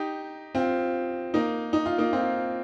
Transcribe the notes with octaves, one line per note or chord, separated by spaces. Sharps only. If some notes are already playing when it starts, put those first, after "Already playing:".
Already playing: D#4 G4
C4 F4
A#3 D#4
D#4
F4
A#3 D#4
C4 F4